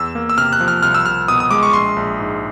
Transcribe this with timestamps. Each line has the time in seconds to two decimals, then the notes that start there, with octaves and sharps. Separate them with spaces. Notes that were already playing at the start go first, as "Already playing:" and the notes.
Already playing: E2 E6
0.15 A#3
0.29 E6
0.38 C3 F6
0.53 F#6
0.60 F3
0.68 F6
0.82 C2 F6
0.95 E6
1.06 C2 F6
1.28 B2 D#6
1.40 D#6
1.51 G#3 D6
1.63 C#6
1.73 A#1 C6
1.96 A#1
2.19 G#2